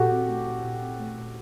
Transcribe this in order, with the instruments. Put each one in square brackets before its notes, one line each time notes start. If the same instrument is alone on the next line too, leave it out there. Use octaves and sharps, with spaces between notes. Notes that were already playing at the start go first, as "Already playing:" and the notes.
Already playing: [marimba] A#2 [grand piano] F#4 G4 A4
[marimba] C4
A3
A#2
A#2
C4
A3
A#2